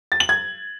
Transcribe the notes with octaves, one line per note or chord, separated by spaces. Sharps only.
A6
F#7
G#6